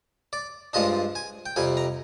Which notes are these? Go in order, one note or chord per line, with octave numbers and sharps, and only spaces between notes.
D5
G2 F3 G#3 D4 D#5
G#5
G5
F2 C3 G3 G#5
A#5